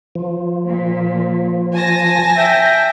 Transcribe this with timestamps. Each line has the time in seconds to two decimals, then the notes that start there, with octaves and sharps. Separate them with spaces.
0.15 F3
0.67 A#2
1.74 G#5 A5 A#6
2.36 E5 G5